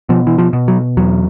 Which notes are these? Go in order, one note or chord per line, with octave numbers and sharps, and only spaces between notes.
B2 F3
E3
F3
B2
F#3
E2 F#3